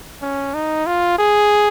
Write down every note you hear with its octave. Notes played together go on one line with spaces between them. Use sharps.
C#4
D#4
F4
G#4